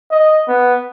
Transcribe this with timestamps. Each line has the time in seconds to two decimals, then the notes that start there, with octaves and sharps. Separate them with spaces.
0.11 D#5
0.48 B3